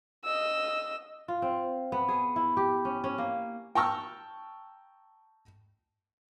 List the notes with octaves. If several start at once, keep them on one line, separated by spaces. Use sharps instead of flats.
D#5 E6
F4
C4
B3
G#4
E4
G4
C#4
C#4
A#3
G5 A5 A#5 C#6 E6 F6